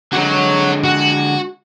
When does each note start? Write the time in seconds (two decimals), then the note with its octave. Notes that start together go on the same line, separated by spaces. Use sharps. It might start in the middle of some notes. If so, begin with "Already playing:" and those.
0.13 D3 G#3 F#4 C#5
0.84 F#4